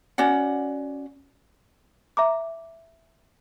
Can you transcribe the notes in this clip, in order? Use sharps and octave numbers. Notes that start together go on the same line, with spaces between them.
C#4 F#4 D5 F#5
E5 A#5 D6